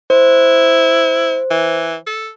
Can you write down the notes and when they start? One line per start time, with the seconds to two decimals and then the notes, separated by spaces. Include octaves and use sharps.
0.10 E4 C5
1.50 E3
2.07 A4